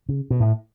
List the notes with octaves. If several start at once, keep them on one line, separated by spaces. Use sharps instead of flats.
C#3
B2
A2